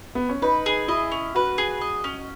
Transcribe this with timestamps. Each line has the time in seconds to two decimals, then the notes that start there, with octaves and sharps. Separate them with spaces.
0.15 B3
0.29 C#4
0.42 D#4 B4
0.66 G#4
0.88 E4 D#5
1.11 C#4
1.35 F#4 B4
1.58 G#4
1.81 D#5
2.04 C#4